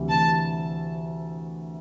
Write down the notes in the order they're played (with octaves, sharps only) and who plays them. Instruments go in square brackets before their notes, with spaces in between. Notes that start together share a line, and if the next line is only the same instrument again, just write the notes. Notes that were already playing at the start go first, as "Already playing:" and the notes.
Already playing: [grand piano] D2 C3 E3 G3
[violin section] A5